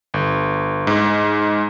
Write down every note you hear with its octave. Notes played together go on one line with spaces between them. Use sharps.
G1
G#2